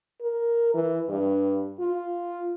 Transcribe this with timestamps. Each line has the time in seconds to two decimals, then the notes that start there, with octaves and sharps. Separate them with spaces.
0.21 A#4
0.74 E3
1.09 G2
1.80 F4